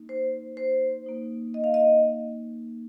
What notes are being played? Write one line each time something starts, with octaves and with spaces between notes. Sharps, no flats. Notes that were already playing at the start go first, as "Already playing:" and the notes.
Already playing: A#3 D#4
C5
C5
A#3 D#4
D#5
F5
D#5